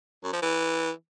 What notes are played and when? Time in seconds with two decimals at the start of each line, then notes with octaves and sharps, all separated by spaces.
0.24 F#2
0.33 F3
0.42 E3